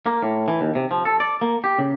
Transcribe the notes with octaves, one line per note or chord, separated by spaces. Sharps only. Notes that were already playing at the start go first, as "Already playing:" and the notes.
A#3
A2
E3
D#2
C3
F3
A4
D5
A#3
G4
C#3